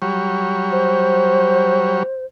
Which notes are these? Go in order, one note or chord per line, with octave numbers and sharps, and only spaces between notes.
F#3 G3 C#5
C5